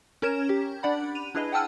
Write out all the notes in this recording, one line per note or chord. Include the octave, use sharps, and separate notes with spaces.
C#4 A#4 A#5 G#6 E7
G4
D4 D5 F#5 B5
D#7 F7
D4 E4 G#4 B4 D#5
F#5 G5 A5 E6 F6 D#7